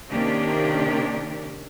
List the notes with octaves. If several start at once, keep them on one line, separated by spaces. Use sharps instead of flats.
C3 D#3 A#3 C#4 D4 G4